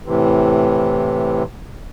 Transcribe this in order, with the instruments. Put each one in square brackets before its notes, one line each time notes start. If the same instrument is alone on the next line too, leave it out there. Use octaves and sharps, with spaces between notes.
[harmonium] A2 C3 E3